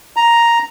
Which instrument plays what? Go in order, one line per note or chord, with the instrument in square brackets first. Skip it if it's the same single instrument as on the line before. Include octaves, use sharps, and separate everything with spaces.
[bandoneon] A#5